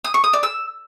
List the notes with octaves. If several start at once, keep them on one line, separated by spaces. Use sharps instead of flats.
D#6
C#6
D#6
D5
E6